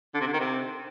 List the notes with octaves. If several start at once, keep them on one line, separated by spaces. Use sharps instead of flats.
D3
C3
D3
D#3
C3